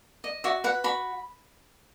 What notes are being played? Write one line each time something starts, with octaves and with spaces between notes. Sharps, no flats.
D#5
F#4 E5
B4 F#5
F#4 B5